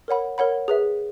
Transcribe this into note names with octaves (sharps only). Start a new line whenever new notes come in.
A#4 C#5 F#5 B5
A#4 C#5 F#5 B5
G#4 B4 E5